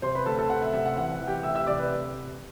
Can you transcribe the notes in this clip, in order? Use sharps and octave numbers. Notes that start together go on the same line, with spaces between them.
C3 C5 C6
B4 B5
D2 A4 A5
A4 A5
C3 F#5
E5
C3 E5
F#5
E3 F#5
F#5
E3
G4 G5
D2 E5 E6
E5 E6
C3 D5 D6
B4